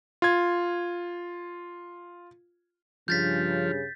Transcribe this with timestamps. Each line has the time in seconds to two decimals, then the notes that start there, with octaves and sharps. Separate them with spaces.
0.22 F4 G#6
3.08 G2 C#3 F3 G6 A6 B6